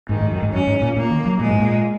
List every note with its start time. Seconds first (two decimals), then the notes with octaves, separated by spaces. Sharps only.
0.09 G#2 D#3
0.21 G#2
0.31 F#2
0.42 G#2
0.53 F#2 C#4
0.67 G#2
0.82 A#2
0.96 A#2 A#3
1.11 D#3
1.25 F#3
1.39 A#2 G#3
1.49 G#2
1.58 A#2